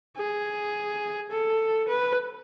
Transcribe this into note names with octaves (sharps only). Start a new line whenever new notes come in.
G#4
A4
B4